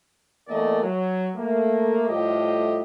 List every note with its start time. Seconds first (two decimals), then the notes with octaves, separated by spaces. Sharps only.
0.48 E2 A3 A#3 A#4 D5 D#5
0.83 F#3
1.36 A3 A#3
2.08 A2 F3 G3 A3 G4 D#5